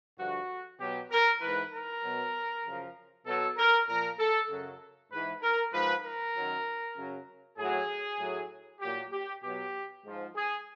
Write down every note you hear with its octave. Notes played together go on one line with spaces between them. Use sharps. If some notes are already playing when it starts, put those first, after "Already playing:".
G2 D3 F3 F#4
B2 F#3 G4
A#4
G#2 E3 B4
A#4
B2 F#3
F#2 C#3 F3
B2 F#3 A4
A#4
A#2 F3 A#4
A4
F#2 C#3 F#3
G#2 E3 B4
A#4
G#2 F3 B4
A#4
F#2 D#3 F#3
F#2 C#3 F#3
A2 F#3 G#4
A2 F#3
A#2 F#3 G4
G4
B2 F#3 G4
G#2 F3
G#4